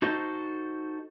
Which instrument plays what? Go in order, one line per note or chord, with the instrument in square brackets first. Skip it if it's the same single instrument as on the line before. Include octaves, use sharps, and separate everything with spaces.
[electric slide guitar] D#4 F#4 A4 C5 D#5